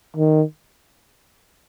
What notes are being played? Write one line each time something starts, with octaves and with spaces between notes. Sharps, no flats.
D#3